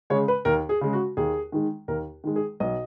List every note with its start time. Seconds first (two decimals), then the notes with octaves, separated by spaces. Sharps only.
0.10 C#3 G#3 C#5
0.28 B4
0.45 D#2 A#4
0.69 G#4
0.81 C#3 G#3
0.93 F#4
1.17 D#2 G#4
1.52 D#3 G#3
1.88 D#2 A#4
2.24 D#3 G#3
2.36 G#4
2.60 B1 D#5